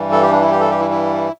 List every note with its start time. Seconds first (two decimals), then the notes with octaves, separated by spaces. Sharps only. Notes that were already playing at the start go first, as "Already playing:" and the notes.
Already playing: G2 E3 G3
0.12 A4
0.22 G4
0.32 D4
0.41 E4
0.51 G4
0.61 A4
0.71 G4
0.80 E4
0.91 E4